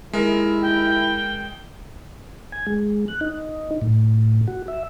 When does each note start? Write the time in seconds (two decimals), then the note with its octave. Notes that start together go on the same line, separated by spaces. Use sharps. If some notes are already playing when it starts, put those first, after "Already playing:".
0.13 D#2 G#3 E4 A#4
0.62 G5
2.52 G#5
2.67 G#3
3.08 F#6
3.21 D#4
3.81 A2
4.48 F#4
4.68 E5